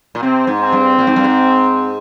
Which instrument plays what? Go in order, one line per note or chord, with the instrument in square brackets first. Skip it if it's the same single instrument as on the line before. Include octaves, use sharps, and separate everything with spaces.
[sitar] A#2
[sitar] C3 [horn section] C4
[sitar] G#2
[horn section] C4
[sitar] G2
A#2
G#2
G2
G#2